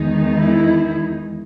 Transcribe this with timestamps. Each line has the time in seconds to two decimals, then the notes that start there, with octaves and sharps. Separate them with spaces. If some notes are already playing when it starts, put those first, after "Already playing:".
Already playing: E2 D#3 G#3 D#4
0.35 E4